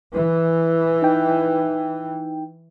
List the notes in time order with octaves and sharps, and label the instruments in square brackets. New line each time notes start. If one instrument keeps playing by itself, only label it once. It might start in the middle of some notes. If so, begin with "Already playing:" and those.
[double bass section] E3
[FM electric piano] D#4 G5